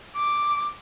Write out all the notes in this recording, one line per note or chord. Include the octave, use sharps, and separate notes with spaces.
D6